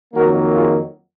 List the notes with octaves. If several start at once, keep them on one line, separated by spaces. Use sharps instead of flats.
F2 D#3 F#3 A#3 F#4 A#4
F4 G#4